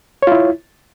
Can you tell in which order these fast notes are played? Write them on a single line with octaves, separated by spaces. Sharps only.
C#5 F4 E4